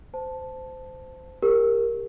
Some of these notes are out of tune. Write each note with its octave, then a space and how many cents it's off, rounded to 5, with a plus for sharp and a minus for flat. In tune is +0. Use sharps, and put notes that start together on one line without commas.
C5 -20 A5 +0
G4 +30 A#4 +0